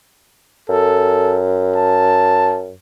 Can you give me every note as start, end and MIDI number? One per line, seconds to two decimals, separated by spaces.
0.69 2.74 42
0.69 1.39 69
1.76 2.58 81